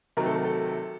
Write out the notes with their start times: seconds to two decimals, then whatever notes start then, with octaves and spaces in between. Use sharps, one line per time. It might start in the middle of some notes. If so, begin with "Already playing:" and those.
0.17 C3 D#3 F#3 A3 A#4
0.26 A4
0.35 A#4
0.45 A4